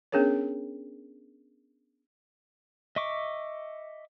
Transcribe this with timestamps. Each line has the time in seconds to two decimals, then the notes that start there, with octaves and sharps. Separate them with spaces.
0.12 B3 C#4 D4 G#4 A#4 C#5
2.96 D#5 E5 C#6 D6